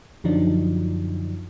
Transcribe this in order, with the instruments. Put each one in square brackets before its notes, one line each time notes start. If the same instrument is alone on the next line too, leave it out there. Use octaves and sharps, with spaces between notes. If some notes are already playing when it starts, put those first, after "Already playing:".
[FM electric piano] F#2 D3 F3 F#3 D4 D#4